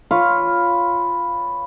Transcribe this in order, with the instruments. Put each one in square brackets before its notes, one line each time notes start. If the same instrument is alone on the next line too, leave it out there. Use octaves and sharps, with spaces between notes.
[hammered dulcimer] F4 B4 C#5 F5